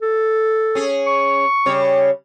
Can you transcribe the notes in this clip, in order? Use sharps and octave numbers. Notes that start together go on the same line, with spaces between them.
A4
C#4 G#4
C#6
C#3 G3 C#5